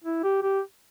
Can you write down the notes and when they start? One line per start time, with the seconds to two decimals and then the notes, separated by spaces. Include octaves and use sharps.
0.04 E4
0.23 G4
0.43 G4